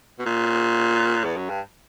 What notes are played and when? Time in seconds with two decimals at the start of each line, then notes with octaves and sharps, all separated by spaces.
0.19 B2
0.25 A#2
1.24 E2
1.36 F#2
1.49 G2